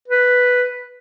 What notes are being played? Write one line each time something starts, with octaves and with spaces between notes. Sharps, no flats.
B4